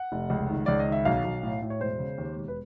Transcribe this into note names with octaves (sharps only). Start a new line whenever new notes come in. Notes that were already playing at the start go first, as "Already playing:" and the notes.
Already playing: F#5
F1
C#2
D#3
C#2 D5
D#5
D#3
E5
B1 F5
B1
A2
A2
C#5
E1 C5
C#3
D#2
E1
B4